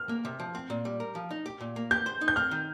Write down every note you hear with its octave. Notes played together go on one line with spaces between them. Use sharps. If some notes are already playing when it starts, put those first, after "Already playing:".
Already playing: F6
A#3
C3
F3
C4
A#2
G3
A#4
F3
D#4
G4
A#2
A#3
G4 G6
C5
D#4
G6
C4 F6
D#3